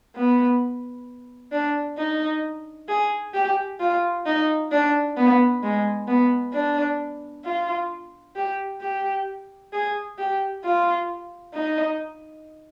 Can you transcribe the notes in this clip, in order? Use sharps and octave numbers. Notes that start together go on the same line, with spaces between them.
B3
D4
D#4
G#4
G4
F4
D#4
D4
B3
G#3
B3
D4
F4
G4
G4
G#4
G4
F4
D#4